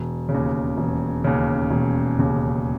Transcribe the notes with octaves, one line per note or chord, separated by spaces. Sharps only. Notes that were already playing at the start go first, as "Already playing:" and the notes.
Already playing: E1
C#3
D#2
E1
D#2 C#3
E1
D#2 C#3